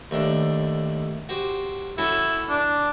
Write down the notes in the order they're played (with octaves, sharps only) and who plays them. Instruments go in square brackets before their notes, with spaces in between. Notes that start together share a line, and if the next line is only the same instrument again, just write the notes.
[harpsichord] D#2 A2 D4
F#4 G4 C5
[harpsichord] C#4 F#4 A4 [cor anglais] E4
[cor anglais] D4